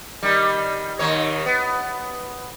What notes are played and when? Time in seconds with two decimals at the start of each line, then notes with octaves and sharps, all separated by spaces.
0.23 D#3 G3
0.99 D#2 D#3 C#5
1.46 B3